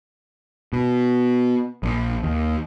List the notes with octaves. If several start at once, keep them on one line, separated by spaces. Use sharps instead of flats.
B2
A#1
D#2